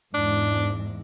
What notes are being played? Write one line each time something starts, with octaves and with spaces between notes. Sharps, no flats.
E2 G#2 D4